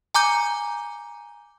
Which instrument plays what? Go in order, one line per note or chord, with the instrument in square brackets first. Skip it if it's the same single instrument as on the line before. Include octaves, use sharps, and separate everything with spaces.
[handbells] G#5 A#5 D6 G6